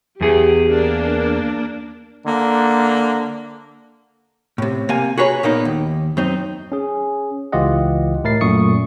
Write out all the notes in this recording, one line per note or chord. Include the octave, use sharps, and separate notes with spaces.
E2 G4 G#4
A#3 D4
D3 A#3
A2 C3
C3 A#3 F5 G#5
F#4 G#4 B4 C#5 A#5
A#2 A#3 B3 D#4
D#2
F#2 C4 D#4
C#4 G#4
C#2 E3 F4 G4 D#5 F#5
A2 E4 A#4 A6 C7
F#2 A#2 A3 C#6 D#6 C#7